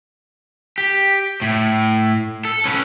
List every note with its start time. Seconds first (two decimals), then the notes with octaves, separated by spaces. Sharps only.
0.78 G4
1.41 A2
2.45 A4
2.65 C#4 B4